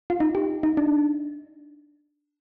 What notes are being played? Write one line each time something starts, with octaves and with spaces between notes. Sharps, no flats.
F4
D#4
G4
D#4
D4